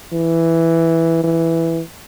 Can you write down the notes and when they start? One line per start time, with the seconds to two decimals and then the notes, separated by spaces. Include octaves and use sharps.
0.13 E3
1.24 E3